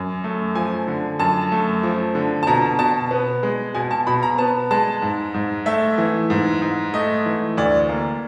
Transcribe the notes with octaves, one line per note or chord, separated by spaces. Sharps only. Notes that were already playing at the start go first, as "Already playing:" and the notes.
Already playing: F#2
A3
F3 G#5
D3
F#2 A5
A3
F3
D3
A5
B2 A#5
B2 A5
B3
G#3
B2 G#5
A5
B2 B5
A#5
B3 A5
G#3 A5
G#2
G#2
A3 E5
E3
G#2
G#2
A3 D#5
E3
D2 D5
A#3